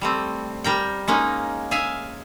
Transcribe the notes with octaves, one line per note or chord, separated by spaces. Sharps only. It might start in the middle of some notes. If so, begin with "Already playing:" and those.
G3 A3 C4
G3 A#4 G5
G#3 A#3 C#4 D#4
G#4 E5 F5 G#5